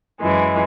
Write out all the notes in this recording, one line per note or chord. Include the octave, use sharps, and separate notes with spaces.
F#2 E3 G#3